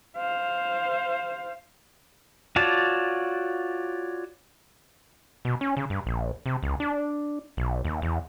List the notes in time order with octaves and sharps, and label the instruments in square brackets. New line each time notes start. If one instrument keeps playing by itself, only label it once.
[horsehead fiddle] C5 F5
[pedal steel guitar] F4 F#4 C#5 D5 A5
[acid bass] B2
C#4
C#3
G2
A#1
C3
C#2
D4
B1
D#2
E2